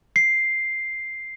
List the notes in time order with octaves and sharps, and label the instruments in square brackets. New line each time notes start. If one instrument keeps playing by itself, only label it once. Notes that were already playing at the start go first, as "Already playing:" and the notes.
[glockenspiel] C7